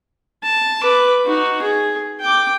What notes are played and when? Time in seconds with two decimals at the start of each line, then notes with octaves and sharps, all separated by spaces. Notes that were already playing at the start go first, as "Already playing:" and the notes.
0.43 A5
0.82 B4 D6
1.26 D#4 F#4
1.62 G#4
2.21 G5 D6